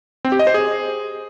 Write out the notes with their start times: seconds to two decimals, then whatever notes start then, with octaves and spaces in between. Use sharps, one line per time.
0.25 C4
0.32 G4
0.39 D#5
0.47 C5
0.54 G#4